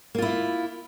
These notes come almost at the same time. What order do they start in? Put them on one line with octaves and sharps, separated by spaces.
A#3 F4 E4